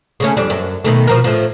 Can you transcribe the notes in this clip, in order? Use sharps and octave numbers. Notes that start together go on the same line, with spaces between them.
C#3 A3 C#4
F2 G3 D4
F#2
B2 D#3 A3
B2 F3 A#4
A2 F3